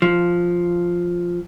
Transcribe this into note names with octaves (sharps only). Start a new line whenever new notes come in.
F3